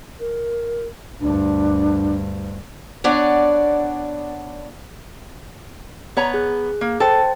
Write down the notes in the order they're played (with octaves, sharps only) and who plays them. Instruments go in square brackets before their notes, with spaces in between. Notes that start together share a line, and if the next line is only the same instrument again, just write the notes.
[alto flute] A#4
[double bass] D2 G2 [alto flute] D4
[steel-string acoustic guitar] B3 D4 C#5 D5 F#5
[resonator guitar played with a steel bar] B3 C#5 A#5
[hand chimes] G#4 F#6
[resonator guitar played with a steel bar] A#3
[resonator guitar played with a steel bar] A4 [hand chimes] C5 G5 A6